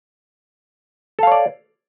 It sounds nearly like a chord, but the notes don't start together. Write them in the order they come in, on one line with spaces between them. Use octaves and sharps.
A4 F5 C#5 D5